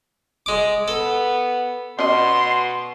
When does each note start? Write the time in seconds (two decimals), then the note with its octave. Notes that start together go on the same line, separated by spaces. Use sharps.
0.46 G#3 D6
0.88 B3 A4
1.99 B2 C#4 D5 D#5 C6